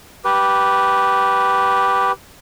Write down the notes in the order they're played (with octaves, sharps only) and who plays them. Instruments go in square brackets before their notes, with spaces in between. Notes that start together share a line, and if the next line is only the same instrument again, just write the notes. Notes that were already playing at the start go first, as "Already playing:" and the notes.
[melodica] G4 B4